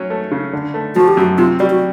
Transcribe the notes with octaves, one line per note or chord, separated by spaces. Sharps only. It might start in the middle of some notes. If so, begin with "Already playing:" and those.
Already playing: F#3 C#4
A3
C#3
D3
A3
F3 F#4
G4
F#2 F#4
C3 F4
G3 F#4
F#4